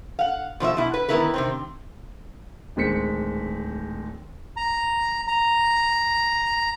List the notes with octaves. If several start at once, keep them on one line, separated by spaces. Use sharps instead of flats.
F5 F#5
B2 F3 A#4 E5
B2 E4
B4
D#3 E3 B3 E4 A#4 B4
C3 D#3 C4
D1 D#3 G#3 C4 B6 C#7
A#5
A#5